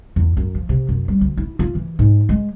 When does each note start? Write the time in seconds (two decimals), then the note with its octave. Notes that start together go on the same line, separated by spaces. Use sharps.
0.16 E2
0.37 F#2
0.55 F3
0.69 C3
0.89 F#2
1.08 G3
1.21 D2
1.37 E4
1.59 F4
1.75 E3
1.99 G#2
2.29 G#3